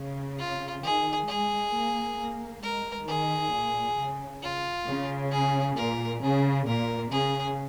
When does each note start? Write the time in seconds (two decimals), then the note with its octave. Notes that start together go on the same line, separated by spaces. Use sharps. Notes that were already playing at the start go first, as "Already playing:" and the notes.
Already playing: C#3
0.38 F4
0.83 D#3 G#4
1.28 G#3 G#4
1.73 A#3
2.17 A#3
2.62 G#3 A#4
3.07 D#3 G#4
3.52 A#2
3.97 C#3
4.43 F4
4.86 C#3
5.31 G#4
5.76 A#2 A#4
6.21 C#3 G#4
6.66 A#2 A#4
7.11 C#3 G#4